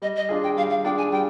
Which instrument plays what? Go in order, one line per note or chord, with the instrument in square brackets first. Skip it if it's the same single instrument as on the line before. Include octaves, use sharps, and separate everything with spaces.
[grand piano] G3 [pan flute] D#5
[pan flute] D#5
[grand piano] D4 F4 G#4
[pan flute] G5
[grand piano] G3 [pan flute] F5
[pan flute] F5
[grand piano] D4 F4 G#4 [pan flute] G5
[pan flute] G#5
[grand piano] G3 [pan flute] G5